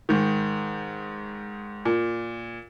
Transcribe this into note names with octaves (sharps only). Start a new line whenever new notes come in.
G#2 D#3
A#2